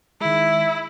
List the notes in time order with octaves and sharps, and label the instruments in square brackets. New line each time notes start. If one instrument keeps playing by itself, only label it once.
[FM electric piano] D#3 G#3 [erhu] E4